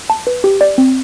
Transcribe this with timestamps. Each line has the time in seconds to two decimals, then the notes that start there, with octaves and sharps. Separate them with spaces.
0.10 A5
0.27 B4
0.44 G4
0.61 D5
0.78 C4